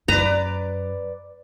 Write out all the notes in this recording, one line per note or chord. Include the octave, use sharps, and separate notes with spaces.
F#2 B4 D5 A#5